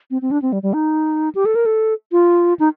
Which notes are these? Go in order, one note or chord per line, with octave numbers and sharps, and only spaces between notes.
C4
C4
D4
C4
G3
G3
D#4
G4
A4
A#4
A4
F4
D#4